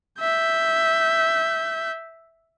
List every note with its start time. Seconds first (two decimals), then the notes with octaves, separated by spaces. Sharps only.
0.20 E5 G6